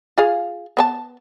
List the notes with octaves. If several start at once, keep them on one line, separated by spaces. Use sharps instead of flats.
F4 G#4 F5
B3 C5 A5